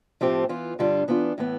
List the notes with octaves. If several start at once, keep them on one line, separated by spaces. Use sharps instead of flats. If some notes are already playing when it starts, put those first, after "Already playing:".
A2 F3 A3 C4 G4
E3 B3 F4
G2 D3 G3 D4 F4
E3 B3 D4 F4
A2 E3 B3